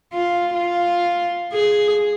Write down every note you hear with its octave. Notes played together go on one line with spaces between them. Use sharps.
F4
F4
G#4